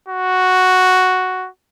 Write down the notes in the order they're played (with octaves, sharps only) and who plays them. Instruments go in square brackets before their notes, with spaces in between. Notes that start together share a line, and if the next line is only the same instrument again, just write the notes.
[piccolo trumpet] F#4